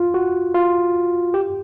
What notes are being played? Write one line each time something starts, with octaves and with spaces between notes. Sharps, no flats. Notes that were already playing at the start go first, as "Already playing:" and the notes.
Already playing: F4
F#4
F4
G4